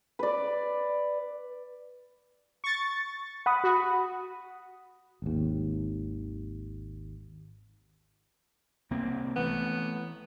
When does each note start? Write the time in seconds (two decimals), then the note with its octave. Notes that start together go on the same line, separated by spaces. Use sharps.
0.19 B4 D5
2.64 C#6 A6
3.46 F#5 B5 D#6
3.64 F#4
5.22 G#1 D#2
8.90 C2 A#3 C4
9.36 E3 A3 B3